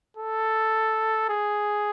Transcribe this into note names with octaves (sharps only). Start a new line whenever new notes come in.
A4
G#4